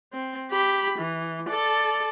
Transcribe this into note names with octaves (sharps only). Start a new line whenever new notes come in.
C4
G4 B5
E3
A4 D5